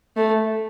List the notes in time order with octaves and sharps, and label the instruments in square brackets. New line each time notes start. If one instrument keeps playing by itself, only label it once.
[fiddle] A3